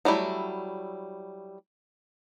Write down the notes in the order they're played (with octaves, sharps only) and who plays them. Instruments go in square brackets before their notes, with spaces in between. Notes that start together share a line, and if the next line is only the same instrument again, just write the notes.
[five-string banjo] F#3 G3 A3 E4